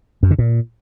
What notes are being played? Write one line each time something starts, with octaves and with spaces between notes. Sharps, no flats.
F#2
D3
A#2